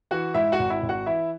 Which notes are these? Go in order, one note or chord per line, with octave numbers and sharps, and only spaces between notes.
E3 F#4 F#5
G#2 E4 E5
F#4 F#5
G#1
E4 E5
G#1
F#4 F#5
E3 E4 E5